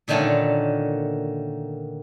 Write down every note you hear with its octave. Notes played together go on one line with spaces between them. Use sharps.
A#2 D3 D#3 A3 C#4 F4